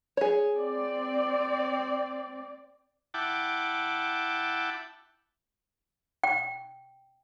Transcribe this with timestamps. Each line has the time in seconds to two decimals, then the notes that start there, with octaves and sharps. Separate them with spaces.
0.17 G#4 C#5
0.58 C4 D5
3.14 E4 F#5 G5 A5 D6
6.24 G5